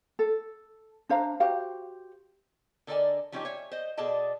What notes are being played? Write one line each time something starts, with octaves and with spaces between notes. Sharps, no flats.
A4
D4 C5 F5 A#5
F#4 G4 C5 F5
D3 A4 A#4 D5 D#5 G#5
F3 G3 C#4 D#4 F4 G4
C#5 E5 G#5
C5 D#5
B2 G#4 A4 D5 D#5 A5